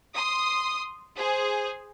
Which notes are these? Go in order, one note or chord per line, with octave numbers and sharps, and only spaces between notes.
C6 D#6
G#4 C5